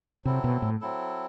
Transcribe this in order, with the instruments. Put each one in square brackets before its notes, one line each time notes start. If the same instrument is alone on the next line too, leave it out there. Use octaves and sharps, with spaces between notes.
[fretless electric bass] C3 [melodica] F#3 C4 E4 A4
[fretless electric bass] B2
A2
[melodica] F#3 C4 E4 A4